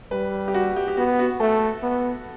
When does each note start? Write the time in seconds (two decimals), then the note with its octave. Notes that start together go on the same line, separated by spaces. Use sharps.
0.11 G3 B4
0.48 G4
0.54 F#4
0.76 G4
0.88 G4
0.97 B3 F#4
1.19 F#4
1.40 A3 A4
1.83 B3